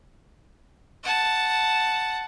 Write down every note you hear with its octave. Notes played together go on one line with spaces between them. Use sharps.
F#5 A5